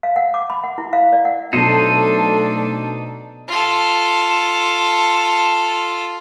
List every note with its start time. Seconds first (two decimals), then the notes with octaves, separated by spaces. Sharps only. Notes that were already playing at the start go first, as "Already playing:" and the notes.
0.03 F5
0.16 F#5
0.34 D6
0.50 B5
0.64 F#5
0.78 E4
0.93 F5
1.12 D5
1.25 F#5
1.53 B2 F#3 A3 D4 D#4 A4 C5 D#5
3.48 F4 A4